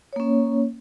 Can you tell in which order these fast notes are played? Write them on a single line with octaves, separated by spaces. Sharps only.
C#5 A#3 C#4